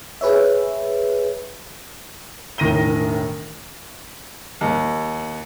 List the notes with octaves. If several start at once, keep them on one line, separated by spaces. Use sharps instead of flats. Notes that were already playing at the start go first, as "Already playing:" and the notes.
G#4 B4 C#5 E5
E1 A2 D#3 A#6 D#7 G7
D#2